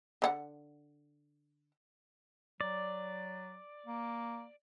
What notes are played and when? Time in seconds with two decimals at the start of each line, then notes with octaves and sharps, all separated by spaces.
0.22 D3 D#4 F#5
2.61 F#3 D5
3.86 A#3